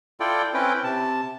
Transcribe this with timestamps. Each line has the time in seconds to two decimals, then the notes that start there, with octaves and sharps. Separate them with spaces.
0.20 E4 F4 A4 D5 G5
0.54 C4 C#4 E4 B4 G5
0.84 C3 A5